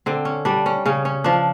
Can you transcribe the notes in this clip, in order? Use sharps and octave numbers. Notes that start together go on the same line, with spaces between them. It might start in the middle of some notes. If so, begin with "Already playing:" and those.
D3 C4
C#4
G3 D4
C#4
C#3 C#4
C#4
F3 D4